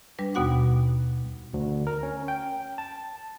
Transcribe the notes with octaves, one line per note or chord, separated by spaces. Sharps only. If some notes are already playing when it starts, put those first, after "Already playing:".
G3 D4 B4
D#2 B2 B3 F#4 F#5 D6
D2
A#4
C#4
G5
A5